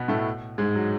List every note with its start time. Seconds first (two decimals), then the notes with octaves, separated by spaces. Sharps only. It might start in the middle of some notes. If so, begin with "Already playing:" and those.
Already playing: B2 B3
0.08 A2 A3
0.58 G#2 G#3
0.75 F#3